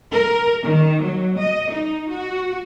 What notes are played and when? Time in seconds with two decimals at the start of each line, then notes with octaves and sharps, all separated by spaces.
0.12 A#4
0.63 D#3
1.02 F#3
1.38 D#5
1.71 D#4
2.10 F#4